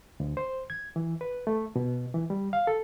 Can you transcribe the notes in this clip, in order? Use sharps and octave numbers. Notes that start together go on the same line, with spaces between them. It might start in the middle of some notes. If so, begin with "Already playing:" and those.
D2
C5
G#6
E3
B4
A3
B2
E3
G3
F5
A4